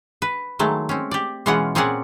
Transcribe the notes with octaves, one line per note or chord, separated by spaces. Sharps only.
B4
D#3 F#3 G#3 A3
C4 C#4
G4 D5
B2 E3 G#3 C#4 F4 F#5
A#2 C4 C#4 G#4 D5 F#5